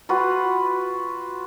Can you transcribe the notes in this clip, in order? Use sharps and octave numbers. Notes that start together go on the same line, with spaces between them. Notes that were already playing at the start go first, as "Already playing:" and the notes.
F4 F#4 B4